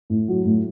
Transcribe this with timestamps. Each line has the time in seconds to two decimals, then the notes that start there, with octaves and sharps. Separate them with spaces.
0.10 A2
0.28 F#3
0.45 A2